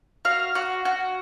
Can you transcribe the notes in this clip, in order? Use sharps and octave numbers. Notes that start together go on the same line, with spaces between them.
F#4 F5
F#4
F#4